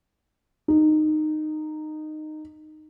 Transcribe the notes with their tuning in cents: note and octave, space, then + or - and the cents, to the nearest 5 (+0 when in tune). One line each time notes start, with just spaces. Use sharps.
D#4 -15